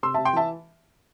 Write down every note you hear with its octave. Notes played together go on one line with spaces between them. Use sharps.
C3 C6 E6
C3 E5 A5
G5 C6
E3 E5 A5